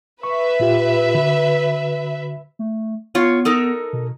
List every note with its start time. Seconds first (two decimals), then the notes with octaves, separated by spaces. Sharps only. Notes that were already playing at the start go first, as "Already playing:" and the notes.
0.23 B4 E5 C#6
0.60 A#2 F4 G4
1.15 D3 F#4
2.59 A3
3.15 B3 F4 C#5
3.45 D#4 A4 A#4
3.93 B2